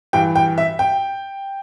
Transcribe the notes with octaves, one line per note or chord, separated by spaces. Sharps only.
G2 E3 G5
G5
E5
G5